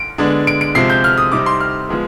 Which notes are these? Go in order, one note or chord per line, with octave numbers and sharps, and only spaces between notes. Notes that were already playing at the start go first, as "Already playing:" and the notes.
Already playing: D7
D3 G#3 B3 D4
D7
D7
C3 F3 G#3 C4 C7
G6
F6
D#6
C3 G3 C4 D#4 D6
C6
F6
F3 G#3 B3